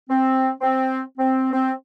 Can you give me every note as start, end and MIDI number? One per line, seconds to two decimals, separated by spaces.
0.09 0.50 60
0.61 1.01 60
1.18 1.50 60
1.53 1.72 60